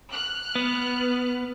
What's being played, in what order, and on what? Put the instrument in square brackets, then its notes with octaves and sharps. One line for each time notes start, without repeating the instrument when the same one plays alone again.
[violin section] F6 F#6
[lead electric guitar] B3